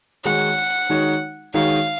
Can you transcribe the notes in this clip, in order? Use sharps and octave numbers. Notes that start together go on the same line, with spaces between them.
D#3 G#3 D#4 F#4 C#5 F#5
D#3 G#3 D#4 F#4 C#5
D#3 G#3 D#4 F#4 C#5 F5